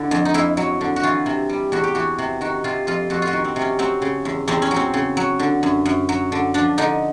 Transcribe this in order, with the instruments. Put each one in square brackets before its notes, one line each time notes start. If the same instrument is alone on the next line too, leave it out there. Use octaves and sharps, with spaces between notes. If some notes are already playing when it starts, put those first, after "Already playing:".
Already playing: [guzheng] D3 E4
F2
D#4
F2 E4
F#3
D3
F#4
E3 F4
C3
G3
E2 F#4
G4
E3 F#4
C3
D#3 F#4
C3 F4
F2 F4
F2 F#4
F4
F#4
D#3
C4
C3
C#4
F#3 C4
C#3
E2
E2 C4
C#4
F#3
C4
C#3
F#3
D3
F#2
F#2
F#3
D3
F3 D4
D3 D#4